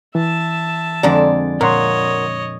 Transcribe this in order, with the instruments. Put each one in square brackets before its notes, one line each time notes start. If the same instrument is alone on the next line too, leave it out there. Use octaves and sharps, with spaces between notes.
[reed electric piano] E3 [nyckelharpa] E5 A5
[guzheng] F2 D3 A#5 [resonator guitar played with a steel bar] G#3 D5
[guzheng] A#2 [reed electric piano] A#4 F#5 C6 [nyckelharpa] C#5 D#5